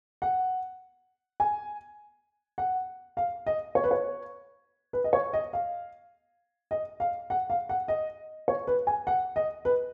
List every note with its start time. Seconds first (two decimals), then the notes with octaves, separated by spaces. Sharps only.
0.22 F#5
1.40 G#5
2.58 F#5
3.17 F5
3.47 D#5
3.75 C#5
3.84 B4
3.91 C#5
4.93 B4
5.04 D#5
5.13 C#5
5.33 D#5
5.53 F5
6.71 D#5
7.00 F5
7.30 F#5
7.50 F5
7.69 F#5
7.88 D#5
8.48 C#5
8.67 B4
8.87 G#5
9.07 F#5
9.36 D#5
9.65 B4